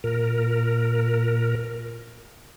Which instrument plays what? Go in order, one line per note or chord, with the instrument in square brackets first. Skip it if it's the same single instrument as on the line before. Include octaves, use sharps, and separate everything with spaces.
[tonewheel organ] A#2 A#4